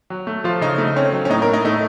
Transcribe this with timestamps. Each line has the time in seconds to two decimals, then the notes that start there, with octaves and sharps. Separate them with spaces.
0.10 F#3
0.27 A3
0.44 F3 F4
0.61 C#3 D#4
0.78 A3 D#4
0.96 C4 C#4
1.13 F#3
1.25 C#4
1.30 A2 D#4
1.42 A#4
1.47 A2
1.53 D#4
1.65 A3 D#4